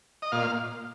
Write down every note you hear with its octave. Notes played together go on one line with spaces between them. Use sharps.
D#5
A#2 F5